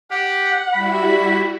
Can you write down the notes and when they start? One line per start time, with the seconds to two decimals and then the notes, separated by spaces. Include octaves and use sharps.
0.11 G4 F#5
0.73 G3 E4 F#4 B5